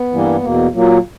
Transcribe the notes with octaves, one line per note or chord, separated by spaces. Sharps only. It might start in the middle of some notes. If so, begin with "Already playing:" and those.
Already playing: B3
G2 E3 G3 A#3
E2 B2 A#3
A#2 F#3 A#3